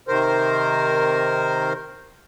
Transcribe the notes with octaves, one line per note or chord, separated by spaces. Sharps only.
C3 D#3 A#4 C5